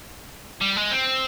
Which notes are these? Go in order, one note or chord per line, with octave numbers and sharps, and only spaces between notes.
G3
G#3
C4